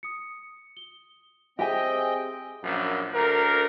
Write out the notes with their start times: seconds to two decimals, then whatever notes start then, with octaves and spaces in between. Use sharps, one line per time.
0.03 D#6 C#7
0.77 G7
1.59 C4 G4 G#4 D#5 E5 G5 G#5
2.63 A#1 F#2
3.14 D2 A#4